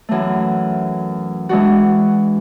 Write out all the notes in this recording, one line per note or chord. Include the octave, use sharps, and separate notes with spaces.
F#2 E3 A3
E3 G#3 D4 F#4